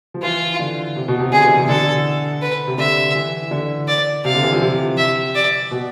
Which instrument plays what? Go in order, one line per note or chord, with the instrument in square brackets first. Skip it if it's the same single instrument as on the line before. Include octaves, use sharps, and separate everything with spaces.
[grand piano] F3
[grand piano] E3 [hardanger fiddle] F4
[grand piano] D3
C3
B2
C3
[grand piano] D3 [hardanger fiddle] G#4
[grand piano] E3
C3
[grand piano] D3 [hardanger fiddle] A4
[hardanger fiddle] B4
[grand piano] C3
[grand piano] D3 [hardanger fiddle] E5
[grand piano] E3
D3
[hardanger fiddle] D5
[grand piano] C3 [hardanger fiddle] F5
[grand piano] D3
E3
F3
C3
[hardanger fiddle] E5
D5
[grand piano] B2